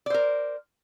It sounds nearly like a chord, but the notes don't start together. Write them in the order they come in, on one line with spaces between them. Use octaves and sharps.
D5 C5 A#4